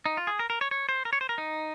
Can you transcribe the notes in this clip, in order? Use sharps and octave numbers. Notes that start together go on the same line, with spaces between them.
D#4
F4
G#4
A#4
A#4
C#5
C#5
C5
A#4
C#5
C5
A#4
D#4